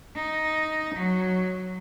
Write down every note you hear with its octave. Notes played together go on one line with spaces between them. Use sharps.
D#4
F#3